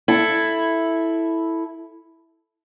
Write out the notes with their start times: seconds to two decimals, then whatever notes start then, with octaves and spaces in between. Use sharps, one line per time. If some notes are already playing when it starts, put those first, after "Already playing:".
0.08 E4 A4